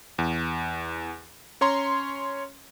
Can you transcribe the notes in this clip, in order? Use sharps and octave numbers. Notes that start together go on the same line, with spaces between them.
E2
C#4 C#5 A#5 C6